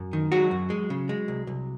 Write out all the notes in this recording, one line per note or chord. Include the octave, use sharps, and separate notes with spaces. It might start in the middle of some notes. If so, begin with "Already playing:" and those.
Already playing: F#2
D#3
F#3 G#3 F#4
F#2
G#3
C#3
G#3
C2
C2